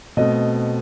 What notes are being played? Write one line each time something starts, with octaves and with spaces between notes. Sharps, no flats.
B2 A3 C4 D#5